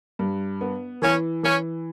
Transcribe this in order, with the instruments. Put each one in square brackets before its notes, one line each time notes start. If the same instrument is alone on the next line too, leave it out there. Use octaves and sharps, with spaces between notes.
[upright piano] G2
B3
[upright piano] E3 [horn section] C#4
[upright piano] E3 [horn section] C#4